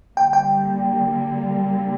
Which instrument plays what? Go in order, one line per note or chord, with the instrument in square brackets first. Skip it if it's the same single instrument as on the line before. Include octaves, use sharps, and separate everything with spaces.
[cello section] D3 G3 A#3 [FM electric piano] G5
[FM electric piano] G5